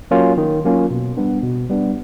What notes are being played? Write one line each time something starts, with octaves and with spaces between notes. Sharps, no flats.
F#3 A#3 C#4 F4
D#3
F#3 A#3 C#4 F4
B2
G3 B3 D4
B2
G3 B3 D4